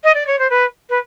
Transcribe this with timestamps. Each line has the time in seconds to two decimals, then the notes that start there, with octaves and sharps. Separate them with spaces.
0.03 D#5
0.14 D5
0.26 C#5
0.38 C5
0.49 B4
0.89 B4